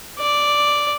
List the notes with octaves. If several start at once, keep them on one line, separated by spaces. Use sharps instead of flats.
D5